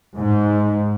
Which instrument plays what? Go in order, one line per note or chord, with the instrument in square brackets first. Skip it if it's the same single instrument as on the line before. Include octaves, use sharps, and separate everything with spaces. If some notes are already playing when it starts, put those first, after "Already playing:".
[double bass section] G#2